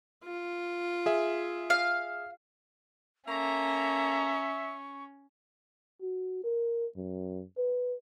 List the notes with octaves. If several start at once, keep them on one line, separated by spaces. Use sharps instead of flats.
F4
G#4 E5
F5
A#3 C#4 A4 E5 A#5 C#6
F#4
A#4
F#2
B4